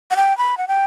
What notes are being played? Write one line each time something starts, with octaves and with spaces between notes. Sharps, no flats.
F#5
G5
B5
F#5
G5